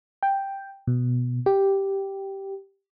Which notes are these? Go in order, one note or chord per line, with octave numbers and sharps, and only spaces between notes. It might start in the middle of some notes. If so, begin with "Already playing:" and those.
G5
B2
G4